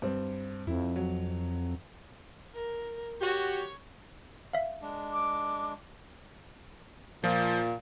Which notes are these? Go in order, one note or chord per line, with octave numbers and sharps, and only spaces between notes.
G2 C4
F2 E4
F#3
A#4
F#4 G4 C#5
E5 F5
G#3 D4
D6
A#2 F3